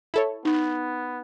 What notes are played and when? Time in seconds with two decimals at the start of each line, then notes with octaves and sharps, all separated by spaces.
0.14 E4 A4 C#5
0.45 B3 D#4